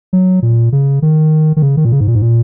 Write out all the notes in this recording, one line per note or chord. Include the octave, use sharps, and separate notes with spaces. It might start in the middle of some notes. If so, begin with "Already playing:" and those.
F#3
A#2
C#3
D#3
D#3
C#3
D#3
A#2
C#3
G#2
A#2
G#2
A#2